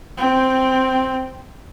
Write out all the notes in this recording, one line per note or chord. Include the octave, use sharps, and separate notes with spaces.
C4 G5